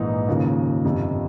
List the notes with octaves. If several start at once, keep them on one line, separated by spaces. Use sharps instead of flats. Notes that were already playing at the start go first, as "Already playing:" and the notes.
Already playing: A#1 G#2 E3 D#4
D#2 C#3 F3
G1 F2 C3